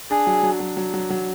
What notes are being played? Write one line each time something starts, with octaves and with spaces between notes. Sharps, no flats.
D4 G#4
F#3
F#3
F#3
F#3
F#3
F#3